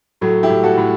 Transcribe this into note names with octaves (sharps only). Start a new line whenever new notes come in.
A2 F#3 A3
E4 G4
A2
F#4 A4
A2